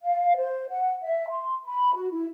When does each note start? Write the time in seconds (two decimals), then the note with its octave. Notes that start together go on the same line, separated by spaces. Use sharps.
0.03 F5
0.37 C5
0.70 F#5
1.02 E5
1.30 C6
1.65 B5
1.94 F#4
2.11 E4